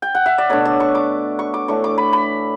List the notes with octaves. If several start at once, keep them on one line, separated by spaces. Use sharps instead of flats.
G5
F#5
E5
D5
B2 A3 D4 C#5
D5
C#6
D6
C#6
D6
A2 E3 A3 D4 C#6
D6
B5
B5